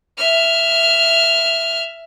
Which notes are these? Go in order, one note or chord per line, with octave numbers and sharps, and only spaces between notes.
E5 F6